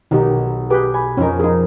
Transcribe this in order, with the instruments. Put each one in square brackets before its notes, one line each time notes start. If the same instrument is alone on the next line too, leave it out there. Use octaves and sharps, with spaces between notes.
[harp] B1 [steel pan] D#3 D#4 G4
[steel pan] G4 G#4 B4 [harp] D6 G6
[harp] G#5 B5
[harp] F2 A#4 [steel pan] C#4 D#4
[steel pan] D#4 G#4